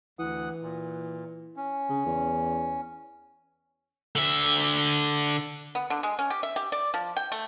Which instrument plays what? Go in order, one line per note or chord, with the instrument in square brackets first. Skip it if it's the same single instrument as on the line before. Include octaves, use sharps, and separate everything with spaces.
[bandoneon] D2 F#5 D#6 [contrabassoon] E3
[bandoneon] A#2
C#4
[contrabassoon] C#3
E2
[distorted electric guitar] D3 E5
[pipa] B3
D3
G#3
C#4
G4
E5
G4
D5
F3
G5
A3